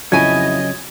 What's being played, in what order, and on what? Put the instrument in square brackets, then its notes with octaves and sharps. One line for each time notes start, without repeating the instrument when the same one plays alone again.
[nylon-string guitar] F2 E4 G#5 [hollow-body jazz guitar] C#3 F#3 [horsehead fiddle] D#5 [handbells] G#6